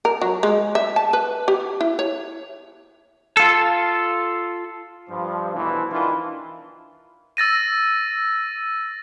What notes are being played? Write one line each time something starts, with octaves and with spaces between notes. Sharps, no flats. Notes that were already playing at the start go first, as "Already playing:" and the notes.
A#4
F#3
G#3
E5
A5
B4
G4
E4
C#5
F4 A4
G2 F3
C2 B2 E3 F3 A3 C4
D#3 E3 D4 E4 F4
E6 A6 A#6 D#7